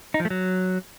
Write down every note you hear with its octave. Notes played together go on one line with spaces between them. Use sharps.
D#4
F3
A3
F#3